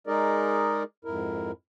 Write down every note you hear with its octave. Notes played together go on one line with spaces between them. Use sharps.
G#3 D#4 G#4 A#4 D5 D#5
F2 G#2 E4 A#4